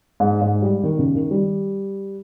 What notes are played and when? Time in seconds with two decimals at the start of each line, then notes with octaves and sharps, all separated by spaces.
0.20 G#2
0.41 G#2
0.62 G3
0.83 D#3
0.99 C#3
1.15 D#3
1.31 G3